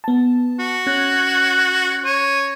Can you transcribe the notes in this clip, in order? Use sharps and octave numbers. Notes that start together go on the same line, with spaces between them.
B3 A5
F#4
C#4 F#6 G#6 A#6
C#5 D#7